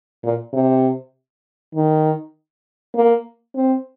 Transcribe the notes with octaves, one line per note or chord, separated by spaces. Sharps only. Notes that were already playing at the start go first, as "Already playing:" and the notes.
A#2
C3
D#3
A#3
C4